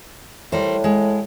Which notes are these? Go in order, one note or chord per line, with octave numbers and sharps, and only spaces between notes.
A2 G3 A#4 C5
G#3